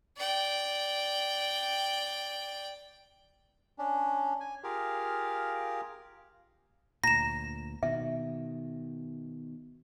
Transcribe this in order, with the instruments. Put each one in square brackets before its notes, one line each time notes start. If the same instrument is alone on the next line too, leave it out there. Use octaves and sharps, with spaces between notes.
[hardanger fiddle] D5 G5
[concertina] C#4 D4
G#5
F4 G4 G#4 A#4 F5
[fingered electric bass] D2 A#2 [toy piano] A#5 [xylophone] A#6 E7
[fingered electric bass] B2 D#3 [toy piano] E5